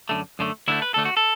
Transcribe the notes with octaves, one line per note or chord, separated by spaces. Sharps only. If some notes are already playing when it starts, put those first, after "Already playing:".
F#2 D3 A3
F#2 D3 A3
D2 D3 A3 E4
B4
D2 D3 A3 A4
F#4
A4